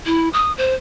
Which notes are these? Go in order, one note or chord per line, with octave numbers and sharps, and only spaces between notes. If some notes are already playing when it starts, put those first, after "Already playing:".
E4
D#6
C5